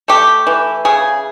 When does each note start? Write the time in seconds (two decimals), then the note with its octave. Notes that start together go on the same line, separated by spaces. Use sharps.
0.08 A3 G4
0.47 E3
0.85 C#3 G#4